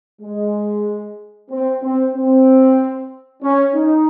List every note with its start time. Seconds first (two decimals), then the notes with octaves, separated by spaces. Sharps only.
0.21 G#3
1.50 C4
1.82 C4
2.14 C4
3.42 C#4
3.75 D#4